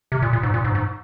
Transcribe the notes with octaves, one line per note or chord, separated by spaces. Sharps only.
C3
A#2
A#2
G#2
A#2
G#2
G#2